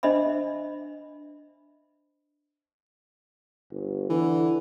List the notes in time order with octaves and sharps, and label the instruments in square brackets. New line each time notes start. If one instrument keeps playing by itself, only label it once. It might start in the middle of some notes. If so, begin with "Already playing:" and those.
[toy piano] D4 C5 D#5 E5 B5
[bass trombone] G1
[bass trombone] D3 [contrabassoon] E3